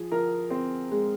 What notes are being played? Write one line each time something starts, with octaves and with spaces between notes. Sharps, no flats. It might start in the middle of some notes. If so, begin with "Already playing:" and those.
Already playing: F3 G#4
F3 A#4
C4
G#3